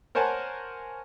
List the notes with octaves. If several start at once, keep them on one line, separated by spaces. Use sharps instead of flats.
A#4 C5 C#5 F#5 G#5 A5